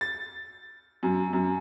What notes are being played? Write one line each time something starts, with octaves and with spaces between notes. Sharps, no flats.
A6
F#2
F#2